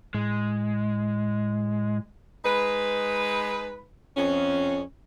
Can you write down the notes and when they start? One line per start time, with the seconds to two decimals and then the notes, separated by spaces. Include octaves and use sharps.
0.14 A2 G#3
2.45 G#3 D#4 B4
4.17 F2 C#4